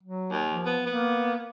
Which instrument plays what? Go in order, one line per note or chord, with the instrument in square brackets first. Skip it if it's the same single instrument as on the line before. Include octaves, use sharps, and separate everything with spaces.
[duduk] F#3
[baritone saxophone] D#2
[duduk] F3
[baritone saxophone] B3
[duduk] A#3 [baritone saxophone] B3